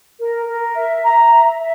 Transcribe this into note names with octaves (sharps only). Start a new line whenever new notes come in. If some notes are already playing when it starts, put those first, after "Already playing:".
A#4
A#4
E5
A#5
E5
E5